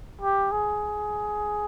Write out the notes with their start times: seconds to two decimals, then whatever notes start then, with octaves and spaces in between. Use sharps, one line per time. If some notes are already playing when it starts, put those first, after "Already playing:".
0.21 G4
0.52 G#4